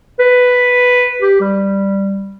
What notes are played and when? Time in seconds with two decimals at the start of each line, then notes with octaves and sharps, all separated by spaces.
0.19 B4
1.22 G4
1.40 G3